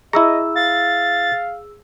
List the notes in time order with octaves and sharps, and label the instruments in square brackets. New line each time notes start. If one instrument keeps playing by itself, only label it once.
[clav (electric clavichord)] E4 A#5 [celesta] G#4 E6 [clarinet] D#5
[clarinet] F5 [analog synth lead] A6